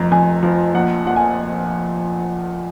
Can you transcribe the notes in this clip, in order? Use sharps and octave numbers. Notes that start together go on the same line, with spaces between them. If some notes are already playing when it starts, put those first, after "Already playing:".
Already playing: F1 F2 A#5
F2 G#5
F3
A#1 F#5
A#2 F#5
G#5